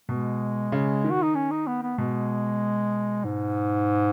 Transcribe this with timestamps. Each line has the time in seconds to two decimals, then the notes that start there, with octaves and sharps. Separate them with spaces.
0.09 B2 G#3
0.72 C#3
1.04 D#3
1.11 F#4
1.23 D#4
1.35 C#4
1.51 D#4
1.67 B3
1.83 B3
1.98 B2 G#3
3.25 G#2